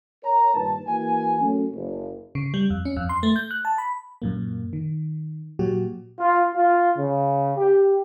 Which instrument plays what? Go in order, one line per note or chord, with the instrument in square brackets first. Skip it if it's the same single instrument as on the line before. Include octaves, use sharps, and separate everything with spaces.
[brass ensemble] A#4 C#5 A#5
G2 A#2 D#3 B4 A5
E3 A#3 F#4 G#5
F#2 A3 C#4
F#1
[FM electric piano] C#3
G3
F2
C#4
F2
C6
A3
G6
F#6
A5
B5
F#2 A#2 A#3
D#3
A#2 F#3 F#4 G4
[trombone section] F4
F4
C#3
G4